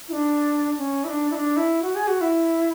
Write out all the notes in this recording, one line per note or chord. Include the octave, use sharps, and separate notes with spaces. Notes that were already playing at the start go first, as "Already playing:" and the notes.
E4
D4
C#4
E4
D4
E4
D4
E4
F#4
G#4
F#4
E4